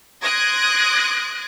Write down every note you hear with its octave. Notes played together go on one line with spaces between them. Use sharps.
C6 D#6 F#6 G#6 A#6 D7